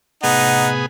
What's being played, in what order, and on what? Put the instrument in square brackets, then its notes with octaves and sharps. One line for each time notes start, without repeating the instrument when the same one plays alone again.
[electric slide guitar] A2 C3 B4 [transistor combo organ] B3 G#4 [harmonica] D#4 [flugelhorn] F#5